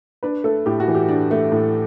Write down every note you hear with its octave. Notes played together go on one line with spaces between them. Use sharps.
D4 B4
A3 A4
A2 G4
F#4
E3
G4
D4
A3
A2